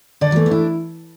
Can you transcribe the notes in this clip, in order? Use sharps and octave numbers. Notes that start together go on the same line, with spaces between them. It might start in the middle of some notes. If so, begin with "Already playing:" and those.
D3 D5
F#3
E3 A3
B3
D4 E4